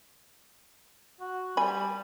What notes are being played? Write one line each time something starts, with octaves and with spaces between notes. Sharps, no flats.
F#4
G3 G#5 B5